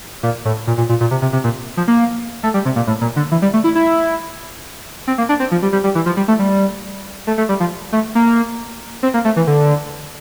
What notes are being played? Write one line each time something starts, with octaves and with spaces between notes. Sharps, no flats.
A#2
A2
A#2
A#2
A#2
A#2
C3
C3
C3
A#2
F3
A#3
A3
G3
C3
A#2
A2
A#2
D3
E3
G3
A3
E4
E4
C4
A#3
D4
C4
F3
G3
G3
G3
E3
F3
G3
A3
G3
A3
A3
G3
F3
A3
A#3
C4
A#3
A3
E3
D3